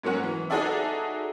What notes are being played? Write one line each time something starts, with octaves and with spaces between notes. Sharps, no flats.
G#2 F#3 A#3 C#4 F#4
E3
D#4 F#4 G#4 A4 D5 E5